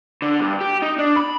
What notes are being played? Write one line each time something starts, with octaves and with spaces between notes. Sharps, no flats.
D3
G2
G4
D#4
D4
B5